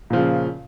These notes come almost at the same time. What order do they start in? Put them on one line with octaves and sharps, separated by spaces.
A#2 F3 C#3